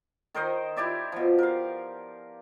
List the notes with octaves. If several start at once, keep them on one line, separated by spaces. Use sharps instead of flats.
D#3 A#4 C5 D#5
E4 G4 D5 E5
B2 F3
A#4 F5